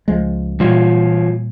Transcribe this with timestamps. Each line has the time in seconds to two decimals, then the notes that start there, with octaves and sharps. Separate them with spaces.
0.08 C#2 F3 G#3
0.60 A#2 E3 G3 F4 C#5